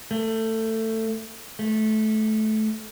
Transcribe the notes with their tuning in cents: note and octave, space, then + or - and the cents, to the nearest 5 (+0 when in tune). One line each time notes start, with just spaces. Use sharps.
A3 +20
A3 -20